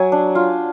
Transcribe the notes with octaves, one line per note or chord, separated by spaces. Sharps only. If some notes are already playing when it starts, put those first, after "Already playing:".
Already playing: F#3 G#5
D4
F4